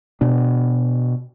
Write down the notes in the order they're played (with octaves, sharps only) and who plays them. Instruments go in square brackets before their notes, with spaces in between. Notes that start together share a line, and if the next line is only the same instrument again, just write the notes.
[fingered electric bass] B2 B3 D4